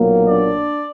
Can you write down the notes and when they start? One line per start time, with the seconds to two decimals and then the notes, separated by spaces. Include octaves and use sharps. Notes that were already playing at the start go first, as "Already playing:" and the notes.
Already playing: B1 A#2 F#3 A#3
0.28 D4 D5